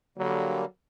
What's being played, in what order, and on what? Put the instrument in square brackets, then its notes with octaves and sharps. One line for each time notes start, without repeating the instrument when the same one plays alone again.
[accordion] D3 G3 A#3 [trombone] F#3